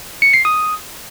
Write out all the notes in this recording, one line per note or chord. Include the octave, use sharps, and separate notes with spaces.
C#7
C7
D#6